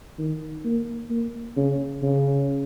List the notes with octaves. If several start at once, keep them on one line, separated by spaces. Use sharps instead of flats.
D#3
A#3
A#3
C#3
C#3